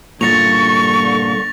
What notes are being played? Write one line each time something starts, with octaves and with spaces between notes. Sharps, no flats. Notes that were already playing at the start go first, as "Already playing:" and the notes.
G2 A#2 D3 C#6 A6 A#6 F7